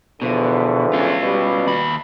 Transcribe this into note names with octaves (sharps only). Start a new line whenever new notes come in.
E2 B2 D3 F3
C#4 F4
B2 G3
D#2 B5